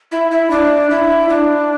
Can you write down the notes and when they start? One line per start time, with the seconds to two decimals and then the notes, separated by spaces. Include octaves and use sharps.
0.12 E4
0.31 E4
0.50 D4
0.90 E4
1.29 D4